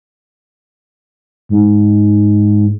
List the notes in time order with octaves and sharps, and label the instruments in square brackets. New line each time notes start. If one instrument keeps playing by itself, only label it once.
[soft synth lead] G#2